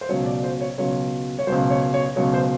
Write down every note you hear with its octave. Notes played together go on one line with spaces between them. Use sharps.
C5
C#2 B2 F#3 C#5
D5
C5
C#5
C#2 B2 F#3 C#5
C#5
C#2 B2 F#3 C5
C#5
C#5
C#2 B2 F#3 C#5
C5